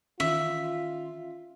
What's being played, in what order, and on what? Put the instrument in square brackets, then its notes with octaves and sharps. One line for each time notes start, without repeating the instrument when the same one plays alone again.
[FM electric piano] D#3 E3 C#4 [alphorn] F4 [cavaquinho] E5